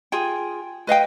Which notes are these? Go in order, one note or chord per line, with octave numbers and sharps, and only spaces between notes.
F4 G#4 G5
B4 D#5 F5 G5